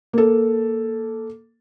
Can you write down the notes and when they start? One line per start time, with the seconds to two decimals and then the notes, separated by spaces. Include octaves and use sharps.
0.13 A#3 A4